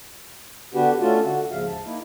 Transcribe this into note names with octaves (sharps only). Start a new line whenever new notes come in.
D3 B3 D4 F#4 G4 B4
A3 C#4 D4 F4 F#4 A4
D3 F#4
D#2 G#2 C#3 F3 E5 F5
A5
A#3 D#4 E4